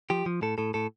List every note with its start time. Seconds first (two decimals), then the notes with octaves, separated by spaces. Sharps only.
0.10 F3 G4
0.26 F3
0.42 A2 A4
0.58 A2 A4
0.74 A2 A4